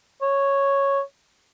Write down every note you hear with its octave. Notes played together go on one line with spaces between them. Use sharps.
C#5